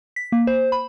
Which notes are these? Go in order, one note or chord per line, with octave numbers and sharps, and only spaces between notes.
B6
A#3
C5
B5